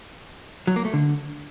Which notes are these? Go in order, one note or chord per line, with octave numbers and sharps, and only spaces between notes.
F#3
A#3
A3
D3